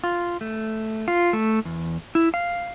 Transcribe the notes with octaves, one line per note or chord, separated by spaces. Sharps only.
F4
A3
F4
A3
E2
E4
F5